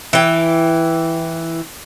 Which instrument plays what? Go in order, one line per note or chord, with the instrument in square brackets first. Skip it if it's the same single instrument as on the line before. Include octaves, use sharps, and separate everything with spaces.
[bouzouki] E3 G5